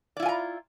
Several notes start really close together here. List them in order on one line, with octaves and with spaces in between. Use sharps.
D5 E4 F4 G#5 A#5